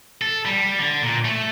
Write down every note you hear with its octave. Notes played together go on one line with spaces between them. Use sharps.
A4
G3
D3
A#2
A3